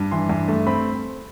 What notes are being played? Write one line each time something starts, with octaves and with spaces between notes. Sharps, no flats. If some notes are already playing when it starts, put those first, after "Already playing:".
Already playing: G2
E3 C6
G2
A3
C4 B5